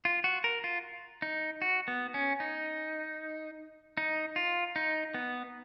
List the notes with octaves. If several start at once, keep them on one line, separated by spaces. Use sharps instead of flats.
F4
F#4
A#4
F4
D#4
F#4
B3
C#4
D#4
D#4
F4
D#4
B3